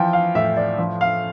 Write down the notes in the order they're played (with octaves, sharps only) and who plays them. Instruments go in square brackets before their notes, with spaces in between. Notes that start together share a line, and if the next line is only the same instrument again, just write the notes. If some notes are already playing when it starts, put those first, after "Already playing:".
Already playing: [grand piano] E3 F3 G5
F5
A2 E5
D5
F3
F5